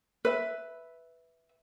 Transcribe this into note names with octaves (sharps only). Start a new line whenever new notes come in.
B4 E5